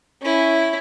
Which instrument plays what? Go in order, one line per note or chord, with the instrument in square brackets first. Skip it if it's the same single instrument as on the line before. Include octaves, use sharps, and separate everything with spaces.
[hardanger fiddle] C#4 E4